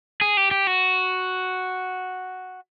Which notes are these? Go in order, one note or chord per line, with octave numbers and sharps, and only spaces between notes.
G#4
G4
G4
F#4